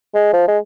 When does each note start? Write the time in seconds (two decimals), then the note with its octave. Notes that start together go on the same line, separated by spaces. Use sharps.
0.14 G#3
0.33 F3
0.48 G#3